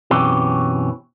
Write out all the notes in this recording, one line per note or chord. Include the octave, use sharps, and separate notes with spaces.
F#2 B2 E3 C4 C#4 G4